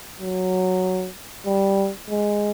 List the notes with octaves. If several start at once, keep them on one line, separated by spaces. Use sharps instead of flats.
F#3
G3
G#3